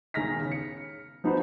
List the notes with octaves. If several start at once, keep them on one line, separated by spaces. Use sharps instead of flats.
E1 D#3 G#4 F6 A#6 B6
C#3
C#7
F3 B3 D#4 F#4 B4 C5